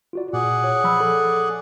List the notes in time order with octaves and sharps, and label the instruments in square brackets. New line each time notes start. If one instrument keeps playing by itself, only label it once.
[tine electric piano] F4 F#4 D5
[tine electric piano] A#2 [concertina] G#4 D5 F#5
[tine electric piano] C#5
F3 B5 E6
A4